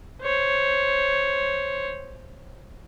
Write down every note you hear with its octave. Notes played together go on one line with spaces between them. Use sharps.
C5 C#5